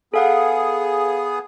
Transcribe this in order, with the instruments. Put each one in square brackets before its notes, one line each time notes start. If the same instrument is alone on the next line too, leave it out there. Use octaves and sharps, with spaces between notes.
[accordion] B3 G#4 [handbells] A4 F5 F#5